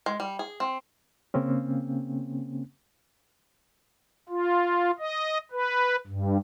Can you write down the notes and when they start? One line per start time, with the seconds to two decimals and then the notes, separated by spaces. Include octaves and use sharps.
0.06 G#3
0.20 G3
0.39 G#4
0.60 C4
1.34 C#3 A#3 C4 C#4
4.29 F4
4.99 D#5
5.52 B4
6.07 G2